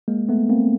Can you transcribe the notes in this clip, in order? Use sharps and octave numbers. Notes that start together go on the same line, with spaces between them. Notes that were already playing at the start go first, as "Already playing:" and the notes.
G#3 A#3
A3 B3
A#3 C4